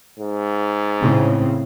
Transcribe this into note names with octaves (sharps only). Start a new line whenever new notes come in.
G#2
A2 C#3 C4